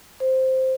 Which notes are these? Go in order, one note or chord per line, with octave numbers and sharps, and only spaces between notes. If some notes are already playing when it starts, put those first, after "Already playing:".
C5